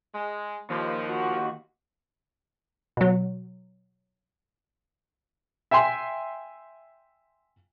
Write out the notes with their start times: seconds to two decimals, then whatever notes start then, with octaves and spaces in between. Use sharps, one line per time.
0.14 G#3
0.70 D#2 F3
1.10 F#4
2.97 B2 F#3
5.71 E5 G5 G#5 C6